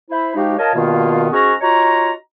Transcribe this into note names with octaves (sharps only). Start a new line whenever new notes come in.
E4 C5 B5
F3 G#3 D#4 F#4 G4
F4 A#4 C#5 D#5 A5
G2 B2 D#3 A#3 B3 F4
G#2 C#4 F#4 G#4 A#5 C#6
D#4 F4 F#4 C#5 A#5